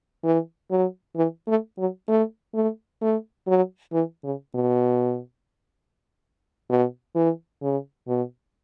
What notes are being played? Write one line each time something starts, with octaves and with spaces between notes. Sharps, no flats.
E3
F#3
E3
A3
F#3
A3
A3
A3
F#3
E3
C#3
B2
B2
E3
C#3
B2